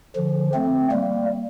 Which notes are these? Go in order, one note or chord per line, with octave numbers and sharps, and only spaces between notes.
D3 F3
A3 C4
G3 A#3